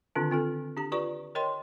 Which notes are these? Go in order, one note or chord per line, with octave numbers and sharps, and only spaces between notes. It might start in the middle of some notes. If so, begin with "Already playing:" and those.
D3 D#3 C4 D4 F4
C4 F4 A4
D4 G4 A#5
F4 G4 B4 D5 A#5 C#6
A#4 C#5 D#5 G5 C6